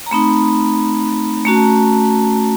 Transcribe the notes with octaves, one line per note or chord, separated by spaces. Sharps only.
A#5
A3 C4 D#4 B5
A3 C#4 F#4 A#5
A5
A#5